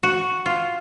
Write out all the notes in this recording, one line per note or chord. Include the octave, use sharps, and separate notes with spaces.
F#4
F4